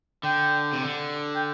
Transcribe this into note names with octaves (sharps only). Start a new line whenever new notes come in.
D3 G5
C3
D3
G5